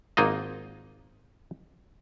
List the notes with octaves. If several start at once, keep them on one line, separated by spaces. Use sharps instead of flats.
G#1 A#3 D#4 F4 D#5